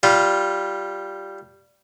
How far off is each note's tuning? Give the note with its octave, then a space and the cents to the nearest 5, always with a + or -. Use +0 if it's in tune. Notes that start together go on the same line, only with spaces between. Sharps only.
G3 -5 F4 +0